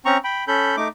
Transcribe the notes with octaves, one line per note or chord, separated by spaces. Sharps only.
C4 C#4 A#5 C#6
G5 B5
C#4 A4 B5 G6
A3 D#4 D6